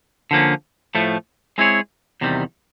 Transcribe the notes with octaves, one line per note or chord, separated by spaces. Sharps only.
D3 F3 A#3 C#4
A2 F3 A3
G#3 C4 E4 G#4 C#5
E2 C3 D#3 G3